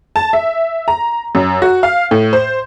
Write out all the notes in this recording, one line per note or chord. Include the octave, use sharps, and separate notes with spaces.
A5
E5
A#5
F#2
F#4
F5
A2
C5